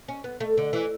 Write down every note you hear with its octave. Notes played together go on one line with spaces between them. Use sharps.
C#4
B3
A3
D3
E3